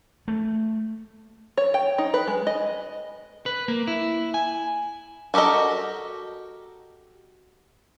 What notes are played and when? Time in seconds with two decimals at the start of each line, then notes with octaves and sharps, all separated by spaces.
0.28 A3
1.57 C#5
1.74 G5
1.98 D#4
2.14 B4
2.27 G#3
2.47 D#5
3.46 B4
3.68 A#3
3.88 E4
4.34 G#5
5.34 F#4 G4 A4 A#4 D#5